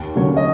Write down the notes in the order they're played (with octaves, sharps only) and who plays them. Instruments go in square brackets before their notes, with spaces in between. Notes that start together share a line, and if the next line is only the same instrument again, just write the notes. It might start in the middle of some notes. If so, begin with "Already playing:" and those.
Already playing: [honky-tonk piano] D#2
[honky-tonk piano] D3 F#3 A#3 C#4 [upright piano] C#5
[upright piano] D#5